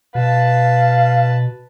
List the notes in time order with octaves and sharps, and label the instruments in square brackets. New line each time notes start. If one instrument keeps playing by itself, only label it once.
[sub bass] B2 [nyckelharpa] B4 A5 [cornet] F5